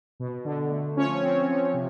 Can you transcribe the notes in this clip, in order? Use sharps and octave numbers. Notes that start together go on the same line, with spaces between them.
B2
D3
A3
F3 C#4 C#5
C4
F3
C3